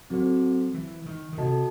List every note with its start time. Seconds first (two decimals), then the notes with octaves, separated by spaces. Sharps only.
0.10 F#3 C4 F#4 A4 C5
0.74 E3
1.06 D#3
1.33 D#3
1.38 C3 F#4 A4 D#5 A5